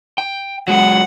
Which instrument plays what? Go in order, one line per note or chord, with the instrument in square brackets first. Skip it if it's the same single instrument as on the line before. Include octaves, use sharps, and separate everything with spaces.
[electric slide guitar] G5
[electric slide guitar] F#3 G#3 [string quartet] F#5